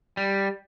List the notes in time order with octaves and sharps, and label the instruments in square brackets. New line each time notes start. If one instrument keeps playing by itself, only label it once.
[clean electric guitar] G3